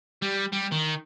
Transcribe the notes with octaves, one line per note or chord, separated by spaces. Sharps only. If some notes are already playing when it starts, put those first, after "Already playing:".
G3
G3
D#3